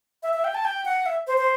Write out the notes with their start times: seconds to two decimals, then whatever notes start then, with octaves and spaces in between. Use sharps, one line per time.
0.23 E5
0.33 E5
0.44 G5
0.55 A5
0.65 G5
0.85 F#5
1.06 E5
1.27 C5
1.38 C5